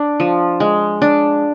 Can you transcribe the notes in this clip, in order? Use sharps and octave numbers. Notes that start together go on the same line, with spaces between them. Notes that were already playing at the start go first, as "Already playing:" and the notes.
Already playing: D4
F3
G#3
D4